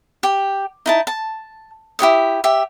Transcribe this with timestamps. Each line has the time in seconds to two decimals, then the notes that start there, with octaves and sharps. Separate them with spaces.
0.23 G4
0.86 D#4 E4 A5
1.07 A5
1.99 E4 G4 C#5 D#6
2.44 G4 E5